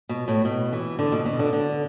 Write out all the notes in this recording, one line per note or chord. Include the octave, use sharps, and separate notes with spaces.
B2
A2
B2
E3
D3
B2
B2
D3
D3